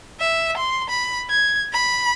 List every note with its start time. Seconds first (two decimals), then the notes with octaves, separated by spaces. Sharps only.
0.19 E5
0.57 C6
0.89 B5
1.30 G#6
1.72 B5